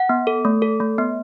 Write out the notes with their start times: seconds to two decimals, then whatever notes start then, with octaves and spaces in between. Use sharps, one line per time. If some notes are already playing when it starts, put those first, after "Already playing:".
Already playing: F#5
0.09 B3
0.27 A4
0.45 A3
0.62 A4
0.80 A3
0.98 B3